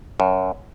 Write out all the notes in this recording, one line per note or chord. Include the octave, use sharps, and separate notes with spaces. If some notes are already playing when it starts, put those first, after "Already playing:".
F#2